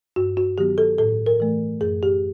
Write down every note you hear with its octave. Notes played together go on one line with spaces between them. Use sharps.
G2 F#4
F#4
D#3 F#3 B3 G4
A4
A2 A4
A#4
E3 A3
F#2 G#4
G4